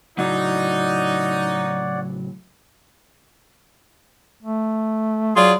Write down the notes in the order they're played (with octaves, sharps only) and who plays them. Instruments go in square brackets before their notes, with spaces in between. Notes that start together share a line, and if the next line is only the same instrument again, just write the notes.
[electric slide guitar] A2 C#3 F#3 [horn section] D#4 [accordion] C#5 D5 F#5
[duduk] A3
[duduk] F#3 [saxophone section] F4 G#4 D5